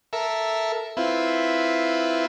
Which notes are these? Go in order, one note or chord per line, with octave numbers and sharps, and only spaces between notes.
A4 A#4 E5
C4 E4 F4 B4